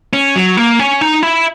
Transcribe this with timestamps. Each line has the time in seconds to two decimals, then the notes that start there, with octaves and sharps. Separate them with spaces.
0.13 C#4
0.36 F#3
0.57 A#3
0.79 C#4
1.01 D#4
1.23 E4